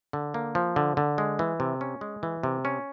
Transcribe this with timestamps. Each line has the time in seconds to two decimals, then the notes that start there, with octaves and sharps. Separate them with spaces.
0.13 D3
0.34 A#3
0.55 F3
0.76 D3
0.97 D3
1.18 G#3
1.39 E3
1.60 C3
1.81 C#4
2.01 G#3
2.23 E3
2.43 C3
2.65 C#4